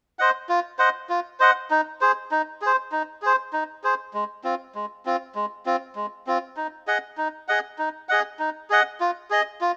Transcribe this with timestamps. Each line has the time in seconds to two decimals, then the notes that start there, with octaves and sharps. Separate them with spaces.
0.19 C5 D#5 F#5
0.49 F4
0.79 C5 D#5 F#5
1.09 F4
1.40 C5 D#5 F#5
1.71 D#4
2.01 G#4 C5
2.31 D#4
2.62 G#4 C5
2.92 D#4
3.22 G#4 C5
3.53 D#4
3.84 G#4 C5
4.14 G#3
4.44 C4 F4
4.75 G#3
5.05 C4 F4
5.35 G#3
5.66 C4 F4
5.96 G#3
6.27 C4 F4
6.57 D#4
6.87 G#4 D#5 F#5
7.18 D#4
7.48 G#4 D#5 F#5
7.78 D#4
8.09 G#4 D#5 F#5
8.39 D#4
8.70 G#4 D#5 F#5
9.00 F4
9.30 G#4 D#5
9.61 F4